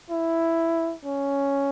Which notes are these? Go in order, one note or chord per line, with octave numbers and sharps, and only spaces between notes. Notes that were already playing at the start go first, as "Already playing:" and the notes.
E4
C#4